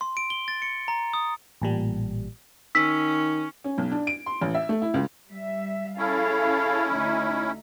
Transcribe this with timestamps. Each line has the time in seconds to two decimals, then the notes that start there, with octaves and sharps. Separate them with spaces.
0.01 C6
0.17 D7
0.30 G7
0.48 A6
0.62 C#7
0.88 A#5
1.14 D#6
1.62 A1 A#2 G3
2.75 D#3 C#4 E6 B6
3.64 C#4
3.78 B1
3.91 D4
4.07 D7
4.26 C6
4.41 A1
4.54 E5
4.69 A3
4.82 E4
4.94 C#2
5.30 G3 E5
5.97 C#4 E4 G#4 A4 F5
6.91 D2 D#4 E5